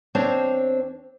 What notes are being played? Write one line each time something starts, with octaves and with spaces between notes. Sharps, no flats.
E2 C4 D4 C5 C#5 A5